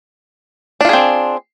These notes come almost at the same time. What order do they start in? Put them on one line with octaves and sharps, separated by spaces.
D4 F4 G#4 C4